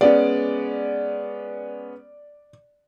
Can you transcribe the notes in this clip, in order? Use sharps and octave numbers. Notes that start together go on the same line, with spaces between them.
G#3 B3 C#4 D5